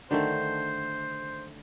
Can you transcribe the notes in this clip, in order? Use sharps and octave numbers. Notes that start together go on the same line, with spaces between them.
D3 D#3 A3 C5